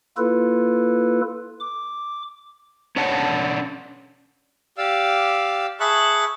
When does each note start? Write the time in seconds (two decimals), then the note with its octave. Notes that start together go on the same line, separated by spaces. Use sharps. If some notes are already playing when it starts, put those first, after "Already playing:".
0.17 A#3 E4 F4 A4 B4
1.60 D6
2.96 C#4 D4 C#5 F#5 A5
4.78 G4 D5 F5 E6
5.80 G#4 E5 A5 B5 C#6 F#6